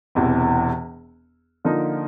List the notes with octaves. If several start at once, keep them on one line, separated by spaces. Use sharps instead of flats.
E1 E2 C3 E3
D3 F3 A#3 D#4